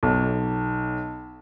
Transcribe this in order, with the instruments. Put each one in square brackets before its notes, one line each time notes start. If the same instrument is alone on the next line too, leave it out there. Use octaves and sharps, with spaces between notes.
[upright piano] B1